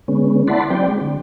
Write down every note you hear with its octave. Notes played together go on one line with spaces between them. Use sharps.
D3 G#3 B3 C#4
E4 D5 F#5 A5 B5 C6
F#3 C4 D5 G5
G#3
D3